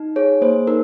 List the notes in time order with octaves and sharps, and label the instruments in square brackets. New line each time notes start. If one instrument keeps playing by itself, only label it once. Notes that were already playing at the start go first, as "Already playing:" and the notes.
Already playing: [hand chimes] D#4
G#4 C#5
A#3 C5
D#4 A#4